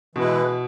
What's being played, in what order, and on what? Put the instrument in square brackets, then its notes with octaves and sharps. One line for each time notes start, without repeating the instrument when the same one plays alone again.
[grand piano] B2 [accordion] E3 G#3 E4 B4